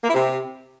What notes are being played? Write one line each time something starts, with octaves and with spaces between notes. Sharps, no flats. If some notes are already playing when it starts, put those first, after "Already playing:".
A#3
E4
C3